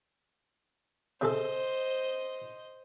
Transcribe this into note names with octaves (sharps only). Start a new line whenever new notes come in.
C3 G#4 A4 C5 D#5